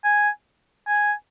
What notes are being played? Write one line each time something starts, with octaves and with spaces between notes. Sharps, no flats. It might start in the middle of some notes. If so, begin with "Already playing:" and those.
G#5
G#5